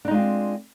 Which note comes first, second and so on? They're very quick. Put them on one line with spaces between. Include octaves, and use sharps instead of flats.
D4 D#4 G#3 F4 C4